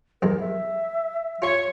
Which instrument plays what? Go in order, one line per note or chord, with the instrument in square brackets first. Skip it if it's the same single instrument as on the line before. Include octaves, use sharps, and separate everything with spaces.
[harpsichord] B1 E2 G#3 [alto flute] A#4
[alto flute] E5
[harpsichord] F4 G#5 C6 [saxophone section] C#5